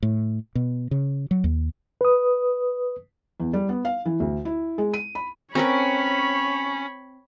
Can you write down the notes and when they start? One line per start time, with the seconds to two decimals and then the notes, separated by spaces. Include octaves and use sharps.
0.03 A2
0.55 B2
0.91 C#3
1.31 F#3
1.44 D#2
2.01 B4 D#6
3.40 E2
3.53 G3
3.69 B3
3.85 F5
4.06 E3
4.20 D2
4.45 E4
4.78 G#3
4.94 D#7
5.15 B5
5.55 C4 C#4 A#4 B4 C#5 B5